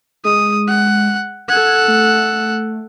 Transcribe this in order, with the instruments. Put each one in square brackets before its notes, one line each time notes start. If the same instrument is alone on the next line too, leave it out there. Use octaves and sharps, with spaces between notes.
[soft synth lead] G#3 [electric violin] D#6
[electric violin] F#5
[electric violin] A4 F#5 [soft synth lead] G#6
[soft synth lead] A3